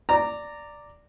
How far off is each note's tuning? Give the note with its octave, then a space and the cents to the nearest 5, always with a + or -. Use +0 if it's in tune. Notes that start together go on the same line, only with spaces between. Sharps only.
D5 +0 A#5 -15